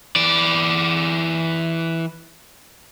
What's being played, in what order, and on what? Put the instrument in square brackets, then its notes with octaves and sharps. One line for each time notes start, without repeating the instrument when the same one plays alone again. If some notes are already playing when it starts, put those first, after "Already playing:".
[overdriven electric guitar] E3 D5